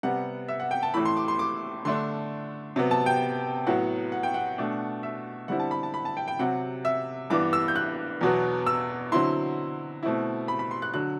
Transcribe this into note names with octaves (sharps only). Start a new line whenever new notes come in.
C3 G3 B3 F#5
E5
F#5
G5
A5
A2 E3 A3 E4 B5
C6
D6
C6
D6
D3 A3 D4 C6
C3 F#3 B3
A5
G5
A2 F#3 B3 F#5
F#5
G5
F#5
B2 A3 D4
E5
D3 G3 C4 E4 F#5
A5
B5
A5
B5
A5
G5
G5
C3 F#3 C4 F#5
E5
G2 E3 B3 D4 D6
E6
G6
F#6
E2 B2 F#3 B3
E6
D3 F#3 C4 E4 C6
B2 A3 C4 E4
B5
B5
C6
F#6
D3 F#3 F#6